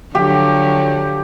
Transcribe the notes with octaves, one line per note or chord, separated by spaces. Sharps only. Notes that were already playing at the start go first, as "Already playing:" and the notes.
D3 F3 F#3 G4